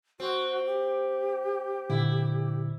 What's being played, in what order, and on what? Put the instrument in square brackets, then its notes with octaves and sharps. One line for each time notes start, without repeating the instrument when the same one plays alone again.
[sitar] C4 [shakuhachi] F#4
[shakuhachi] G4
[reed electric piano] A#2 D3 [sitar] E4